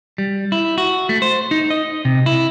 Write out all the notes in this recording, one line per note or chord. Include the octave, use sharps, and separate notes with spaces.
G3
E4
F#4
A3
C5
D#4
D#5
C3
E4